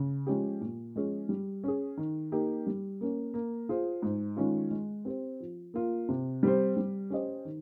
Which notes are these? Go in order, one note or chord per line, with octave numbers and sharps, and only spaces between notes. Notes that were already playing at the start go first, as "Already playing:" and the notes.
Already playing: C#3
F3 G#3 C#4 G4
A#2
F3 G#3 C#4 G#4
G3
C#4 G#4
D#3
A#3 D#4 G4
G3
A#3 C#4
A#3
F4 G#4 C5
G#2
D#3 G#3 C#4 F4
G#3
C4 G4 C5
F3
A#3 F4
C3
G3 C4 G4 C5
G3
C#4 G4 C5 D#5
D#3